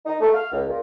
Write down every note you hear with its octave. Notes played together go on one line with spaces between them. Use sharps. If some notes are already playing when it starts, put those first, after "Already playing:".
D#4
A3
F5
C#2
A#2